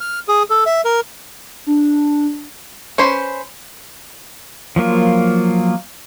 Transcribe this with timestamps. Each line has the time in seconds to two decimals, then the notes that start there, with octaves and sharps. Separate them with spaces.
0.01 F6
0.28 G#4
0.50 A4
0.66 E5
0.85 A#4
1.66 D4
2.98 C#4 B4 C5
4.76 F3 F#3 A#3 F4